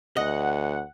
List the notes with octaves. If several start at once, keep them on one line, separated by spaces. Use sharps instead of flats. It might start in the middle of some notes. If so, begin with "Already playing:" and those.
D2 D#5 F#5